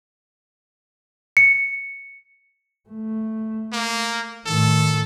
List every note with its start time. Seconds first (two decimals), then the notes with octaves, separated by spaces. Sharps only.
1.37 C#7
2.89 A3
3.72 A#3
4.46 A2 D#3 A4